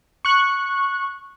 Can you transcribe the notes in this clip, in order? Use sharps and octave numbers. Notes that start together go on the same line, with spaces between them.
C#6 F#6